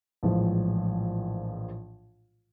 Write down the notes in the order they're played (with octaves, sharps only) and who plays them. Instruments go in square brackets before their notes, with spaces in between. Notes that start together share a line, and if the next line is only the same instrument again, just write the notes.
[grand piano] A#1 A2 E3 F3 G#3